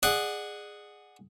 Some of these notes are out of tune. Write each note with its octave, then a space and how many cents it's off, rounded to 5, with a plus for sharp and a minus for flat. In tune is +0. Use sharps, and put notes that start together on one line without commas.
G#4 +0 D5 +35 F#5 +0